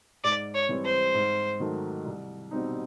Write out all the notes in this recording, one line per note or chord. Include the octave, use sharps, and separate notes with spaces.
G#2 D5
C#5
E3 G3 C4
C5
G#2
D#3 F#3 A3
C2
B2 G3 C4 D#4